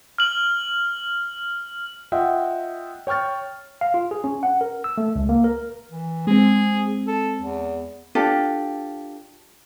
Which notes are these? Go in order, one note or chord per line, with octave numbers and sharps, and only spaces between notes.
F6 F#7
F4 D#5 E5 F#5 G5
C#5 G5 C#6 F6 A6
F5
F4
G#4
C#4
F#5
A#4
E6
A3
C#2
A#3
A#4
E3
G#3 C4 G#4
A4
E2
D4 F4 G4 A4